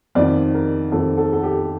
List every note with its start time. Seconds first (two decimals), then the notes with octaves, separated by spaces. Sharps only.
0.15 F2 D#3 D5
0.54 A#4
0.92 F2 D#3 A4
1.17 A4
1.33 A4
1.43 G4